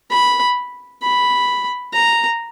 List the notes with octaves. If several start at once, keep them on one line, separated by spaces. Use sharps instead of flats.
B5
B5
A#5